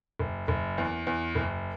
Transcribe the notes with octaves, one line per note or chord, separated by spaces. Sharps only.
F#1
F#1
E2
E2
F#1